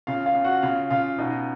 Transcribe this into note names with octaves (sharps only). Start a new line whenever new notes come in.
C#3 F4 F5
F4 F5
C#3
F#4 F#5
C#3 F4 F5
C#3 F4 F5
B2 D#4 D#5